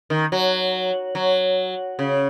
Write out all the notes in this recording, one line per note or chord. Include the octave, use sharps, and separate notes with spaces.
D#3
F#3
F#3
C#3